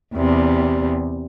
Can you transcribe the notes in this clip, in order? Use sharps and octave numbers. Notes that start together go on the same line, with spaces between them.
E2 C3 G3